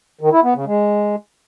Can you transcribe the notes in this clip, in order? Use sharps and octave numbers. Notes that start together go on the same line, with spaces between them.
D#3
E4
B3
C#3
G#3